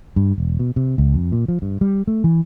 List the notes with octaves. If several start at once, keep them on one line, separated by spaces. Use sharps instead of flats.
G2
E1
B2
C3
C#2
F2
A#2
F3
G2
G3
A3
E3